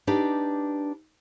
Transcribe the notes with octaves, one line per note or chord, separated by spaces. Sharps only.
D4 D#4 G4 B4